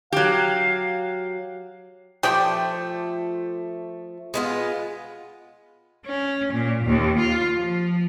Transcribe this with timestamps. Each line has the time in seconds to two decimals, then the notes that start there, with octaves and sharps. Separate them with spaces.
0.13 F#3 G4 F5
2.23 F3 A3 G4 C5 D5 G5
4.34 G#3 B3 F4
6.06 C#4
6.53 A#2
6.85 D#2
7.19 F4
7.57 F3